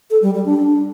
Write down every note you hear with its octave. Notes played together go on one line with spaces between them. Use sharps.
A4
G3
G3
D4
D4